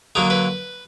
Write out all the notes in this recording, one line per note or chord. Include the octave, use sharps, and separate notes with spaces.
D3 F#3 A#3 D#4
B4